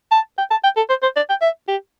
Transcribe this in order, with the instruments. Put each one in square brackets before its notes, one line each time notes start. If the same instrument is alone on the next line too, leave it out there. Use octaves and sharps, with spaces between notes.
[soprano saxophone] A5
G5
A5
G5
A4
C5
C5
D5
G5
E5
G4